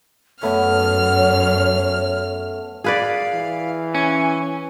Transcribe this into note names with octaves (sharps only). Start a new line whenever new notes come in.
F#2 A3 B3 C#5 F6
G#4 B4 D5 F5
E3
C#4 G#5